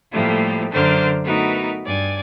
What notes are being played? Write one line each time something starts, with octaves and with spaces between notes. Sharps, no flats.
A2 F3 G3 A3 A#3
F#2 D3 A#4 C5 D6 F6
A3 B3 D#4 F#4 A#4 B4
G2 D5 G#5